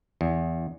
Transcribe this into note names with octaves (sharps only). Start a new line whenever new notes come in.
E2